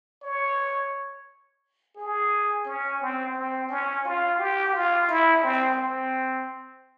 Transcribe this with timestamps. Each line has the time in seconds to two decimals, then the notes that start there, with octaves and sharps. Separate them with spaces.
0.23 C#5
1.97 G#4
2.65 C#4
3.01 C4
3.35 C4
3.69 C#4
4.05 F4
4.39 G4
4.73 F4
5.09 E4
5.43 C4
5.79 C4